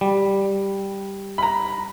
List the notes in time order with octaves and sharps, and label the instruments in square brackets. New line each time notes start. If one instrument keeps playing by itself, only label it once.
[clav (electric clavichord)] G3
[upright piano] A#5 B5